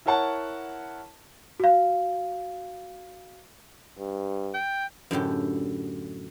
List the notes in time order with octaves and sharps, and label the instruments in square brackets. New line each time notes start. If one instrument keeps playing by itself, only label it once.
[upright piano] E4 A#4 C#5 F#5 A5
[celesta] F#4 F5
[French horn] G2
[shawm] G5
[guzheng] F#2 A2 D3 G4